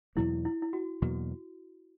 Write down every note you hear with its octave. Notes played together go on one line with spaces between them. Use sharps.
E2 B2 F#3 A#3 E4
E4
E4
F#4
E2 B2 F#3 A#3 F#4